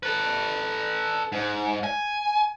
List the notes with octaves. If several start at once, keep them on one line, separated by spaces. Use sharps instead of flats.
A4 B4
G#2
G#5